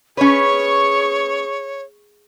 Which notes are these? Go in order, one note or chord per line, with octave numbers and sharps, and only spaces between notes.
C#4 G#4 B4 C#5 C#6